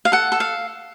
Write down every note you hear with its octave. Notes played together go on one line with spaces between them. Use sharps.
F5
A4 F#5
A4
F5